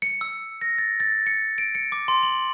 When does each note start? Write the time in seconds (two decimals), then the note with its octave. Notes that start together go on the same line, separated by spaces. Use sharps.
0.02 C#7
0.21 E6
0.61 A#6
0.78 A6
1.00 A6
1.27 C#7
1.58 D7
1.75 C#7
1.92 D6
2.08 C6
2.23 F#7